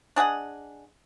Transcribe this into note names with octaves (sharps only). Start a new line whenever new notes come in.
D4 G#4 D#5 F#5